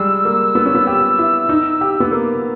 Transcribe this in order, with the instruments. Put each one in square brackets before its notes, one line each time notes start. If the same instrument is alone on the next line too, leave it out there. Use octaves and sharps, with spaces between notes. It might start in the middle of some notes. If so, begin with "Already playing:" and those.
Already playing: [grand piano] G3 G#3 [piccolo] E6
[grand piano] A#3
B3
C#4
B3
G4
E4
D#4
G4
B3
A#3